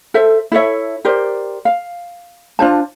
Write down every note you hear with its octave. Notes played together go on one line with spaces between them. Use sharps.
A4 C5 E5
E4 A4 C#5 E5
G4 A#4 C5 D5
F5
D4 F4 C5 A5